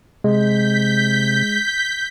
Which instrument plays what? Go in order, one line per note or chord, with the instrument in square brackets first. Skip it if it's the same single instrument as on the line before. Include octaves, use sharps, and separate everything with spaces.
[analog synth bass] C3 [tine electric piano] G#3 [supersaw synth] G6 B6